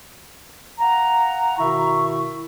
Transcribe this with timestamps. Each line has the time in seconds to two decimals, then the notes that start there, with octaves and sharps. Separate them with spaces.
0.79 F5 F#5 A#5
1.59 B2 D#3 E4 E5 C#6